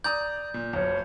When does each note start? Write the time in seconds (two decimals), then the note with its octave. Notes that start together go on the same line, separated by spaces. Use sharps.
0.04 D5 A#5 D#6 G6
0.54 A#2
0.73 F#1 B1 C#5